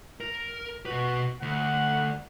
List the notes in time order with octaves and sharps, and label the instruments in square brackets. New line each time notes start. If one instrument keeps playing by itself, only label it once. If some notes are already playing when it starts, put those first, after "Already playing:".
[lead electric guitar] A#4
[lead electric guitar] B2 B4 [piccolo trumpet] F#4
[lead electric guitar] D2 [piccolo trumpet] F#5